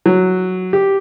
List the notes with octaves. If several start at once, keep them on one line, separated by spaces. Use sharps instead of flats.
F#3
G4